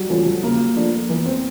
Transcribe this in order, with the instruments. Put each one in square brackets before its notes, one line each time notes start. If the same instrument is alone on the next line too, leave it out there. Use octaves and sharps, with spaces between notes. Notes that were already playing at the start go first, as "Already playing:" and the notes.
Already playing: [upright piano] F#3 G3
[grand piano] E3 A3 C#4 [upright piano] F3
[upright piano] F#3
[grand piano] C#3 [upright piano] A#3
[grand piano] F3 A3 D4
[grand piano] E3 [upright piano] B3
[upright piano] C4